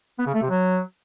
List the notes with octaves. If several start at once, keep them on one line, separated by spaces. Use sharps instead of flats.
B3
C#3
A3
C3
F#3